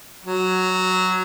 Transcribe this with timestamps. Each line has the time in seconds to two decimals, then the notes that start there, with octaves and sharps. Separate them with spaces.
0.25 F#3